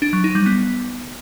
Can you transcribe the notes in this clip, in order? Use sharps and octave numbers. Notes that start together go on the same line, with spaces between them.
D4
F#3
D#4
G3
B3